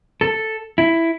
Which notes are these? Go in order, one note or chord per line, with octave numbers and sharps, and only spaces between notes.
A4
E4